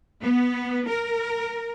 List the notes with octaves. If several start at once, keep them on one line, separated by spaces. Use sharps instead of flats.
B3
A#4